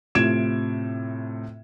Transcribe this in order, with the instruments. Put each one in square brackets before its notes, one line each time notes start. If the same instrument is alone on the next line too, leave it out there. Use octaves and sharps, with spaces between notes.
[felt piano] A2 C3 F4 G#6 D7 E7